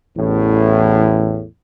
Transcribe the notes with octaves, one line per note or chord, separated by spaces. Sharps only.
A1 E2 A2